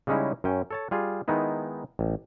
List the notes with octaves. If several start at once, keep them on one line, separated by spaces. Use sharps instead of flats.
C#3 G3 G#3 C#4 D#4 E4
F#2 C#4 G5
A4 C#5 A5
G3 F4 G#4
D#3 G#3 B3 D#4 E4
A1